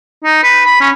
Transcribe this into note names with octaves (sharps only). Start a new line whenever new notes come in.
D#4
B4
B5
C#4